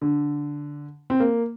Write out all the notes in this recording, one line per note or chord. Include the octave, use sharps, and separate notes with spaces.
D3
C4
A#3